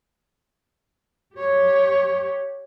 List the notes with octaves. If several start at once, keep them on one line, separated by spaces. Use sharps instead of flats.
G4 C#5